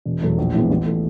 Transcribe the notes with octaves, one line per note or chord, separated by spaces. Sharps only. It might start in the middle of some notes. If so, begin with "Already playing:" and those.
E1
E2 B2 F#3 A3
A#1
A2 E3 G#3 B3
A1
E3 A3